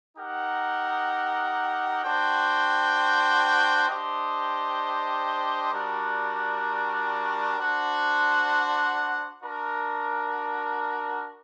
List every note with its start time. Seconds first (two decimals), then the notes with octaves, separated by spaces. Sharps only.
0.17 D#4 G4 A#4 F#5
2.02 D4 F#4 C5 G5
3.88 D4 G4 C5 D#5
5.72 G3 D4 F#4 A#4
7.58 D4 F#4 C5 F#5
9.42 D4 F#4 A#4